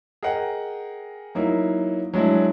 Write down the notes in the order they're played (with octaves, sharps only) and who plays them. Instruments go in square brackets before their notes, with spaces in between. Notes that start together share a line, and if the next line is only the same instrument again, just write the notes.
[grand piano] G#4 A#4 D#5 F#5 G5
F#3 A#3 D#4 E4
F#3 G#3 D4 E4